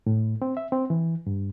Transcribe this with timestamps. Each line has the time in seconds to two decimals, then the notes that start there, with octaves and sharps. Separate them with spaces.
0.07 A2
0.42 C4
0.57 E5
0.72 C4
0.90 E3
1.27 G2